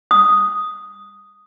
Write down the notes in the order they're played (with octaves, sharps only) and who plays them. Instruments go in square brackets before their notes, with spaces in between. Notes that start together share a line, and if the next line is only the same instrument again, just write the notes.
[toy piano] D#6